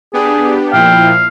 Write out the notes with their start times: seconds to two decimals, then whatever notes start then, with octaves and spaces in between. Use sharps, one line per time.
0.13 B3 D4 G4 G#4
0.73 A#2 F3 E4 F5 G5